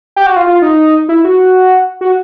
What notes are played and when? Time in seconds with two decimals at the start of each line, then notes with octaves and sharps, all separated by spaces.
0.16 G4
0.26 F#4
0.36 F4
0.47 F4
0.62 D#4
1.09 E4
1.24 F#4
2.01 F#4